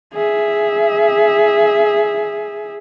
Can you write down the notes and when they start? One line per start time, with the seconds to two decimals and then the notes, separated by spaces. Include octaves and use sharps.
0.14 G#4 E5